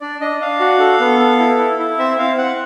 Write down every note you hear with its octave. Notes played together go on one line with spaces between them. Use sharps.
D4 D5
D4 D#5
D4 F5
F#4
A4
B3
A4
E4
E4
E4
C4 E5
C4 F5
C4 F#5